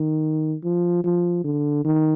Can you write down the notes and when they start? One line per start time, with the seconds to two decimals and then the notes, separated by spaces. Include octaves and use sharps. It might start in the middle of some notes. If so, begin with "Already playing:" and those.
Already playing: D#3
0.63 F3
1.04 F3
1.44 D3
1.84 D#3